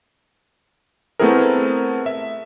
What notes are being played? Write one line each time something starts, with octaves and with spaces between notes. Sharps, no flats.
A3 B3 C4 E4 G#4 A#4
E5